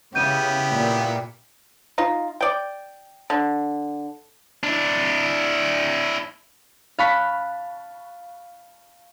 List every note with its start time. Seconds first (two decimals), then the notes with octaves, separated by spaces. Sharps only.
0.15 C#3 B3 E4 G4 G6 D#7
0.74 A#2
1.98 D#4 F4
2.41 D5 G5
3.30 D3
4.63 D4 E4
6.99 F5 A5 B5 C#6 F#6 B6